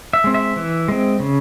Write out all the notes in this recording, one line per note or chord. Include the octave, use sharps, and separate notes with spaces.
E5
G#3 C4
E5
E3
G#3 C4
C#3